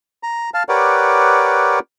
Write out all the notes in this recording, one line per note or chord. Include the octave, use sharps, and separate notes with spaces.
A#5
F5 A5
G4 A#4 B4 C#5 D5 F#5